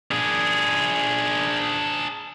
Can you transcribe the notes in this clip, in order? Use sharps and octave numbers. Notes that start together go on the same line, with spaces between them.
D4 G#4